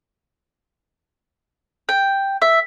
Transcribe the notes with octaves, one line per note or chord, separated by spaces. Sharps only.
G5
E5